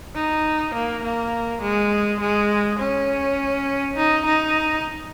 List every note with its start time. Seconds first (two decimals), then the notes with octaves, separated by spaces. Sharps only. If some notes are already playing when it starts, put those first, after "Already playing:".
0.15 D#4
0.74 A#3
1.04 A#3
1.62 G#3
2.20 G#3
2.79 C#4
3.96 D#4
4.25 D#4